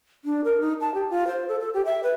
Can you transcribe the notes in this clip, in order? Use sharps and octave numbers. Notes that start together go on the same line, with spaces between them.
D4
A#4
D#4
A5
G4
F4
C5
A4
A4
G4
E5
B4